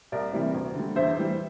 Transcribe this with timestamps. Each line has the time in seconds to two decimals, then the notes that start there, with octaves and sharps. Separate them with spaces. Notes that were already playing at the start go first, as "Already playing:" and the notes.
0.12 C2 A#4 D5
0.33 C3 E3 G3
0.54 D2
0.76 D3 G3
0.96 E2 C5 E5
1.17 E3 G3